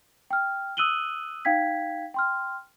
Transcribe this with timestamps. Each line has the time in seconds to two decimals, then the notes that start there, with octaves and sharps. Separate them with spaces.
0.31 G5 F6
0.77 D#6 E6 F#6 D#7 F#7 G7
1.45 D#4 F5 G5 G#6 B6
2.14 G5 C6 F6